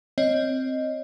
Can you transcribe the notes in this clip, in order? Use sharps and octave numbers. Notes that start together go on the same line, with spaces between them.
C4 C#5 D#5